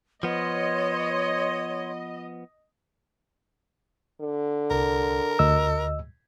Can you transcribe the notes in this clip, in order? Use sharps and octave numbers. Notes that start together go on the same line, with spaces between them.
F3 B3 C#5 D#5 C6
D3
C2 A#4
D2 D#5 E6